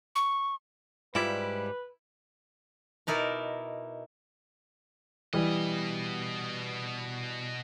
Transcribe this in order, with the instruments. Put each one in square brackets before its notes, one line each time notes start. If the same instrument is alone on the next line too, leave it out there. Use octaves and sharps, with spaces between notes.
[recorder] C#6
[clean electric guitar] G#2 G3 G4 [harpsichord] E4 [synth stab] F4 D5 [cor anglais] B4
[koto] B2 D#4 E4 A#4 D5
[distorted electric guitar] B2 D#5 [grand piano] E3 G3